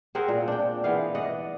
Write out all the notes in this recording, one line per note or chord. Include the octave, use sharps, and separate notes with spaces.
C4 G#4 A#4 F#5
A#2
D4 G5
E3 B3 G#4 F5
D5 D#5 F#5